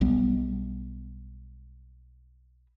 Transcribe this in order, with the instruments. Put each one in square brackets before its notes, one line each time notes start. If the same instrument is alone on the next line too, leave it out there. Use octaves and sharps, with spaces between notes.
[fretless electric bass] B1 G3 B3